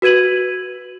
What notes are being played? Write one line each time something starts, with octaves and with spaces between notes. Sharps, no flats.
F#4 B4 G#6 D#7 F#7